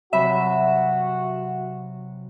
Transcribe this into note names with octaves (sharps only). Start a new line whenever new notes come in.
C3 F#3 F#4 E5 B5